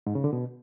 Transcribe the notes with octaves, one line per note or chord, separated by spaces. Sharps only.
G#2
C#3
D3
B2